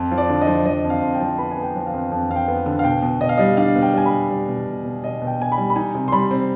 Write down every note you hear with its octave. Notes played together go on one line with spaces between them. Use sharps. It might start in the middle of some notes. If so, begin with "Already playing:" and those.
Already playing: F2
F3
D5
D3
D#5
F3
F3 D#5
F2
F5
F2
G5
F3
B3 B5
G#5
B3
G5
F3
F5
F2
F2
F2 F5
G5
B3
D3
F5
B2 G5
B2
B2 D#5
F5
G3 D#5
D4 F5
B2
G5
G3 G#5
B5
B2
G3
B2
B2
B2
B2 D#5
B2
G5
B2 G#5
B5
G3
B5
D#4 G#5
C3
C6
G3 B5
C4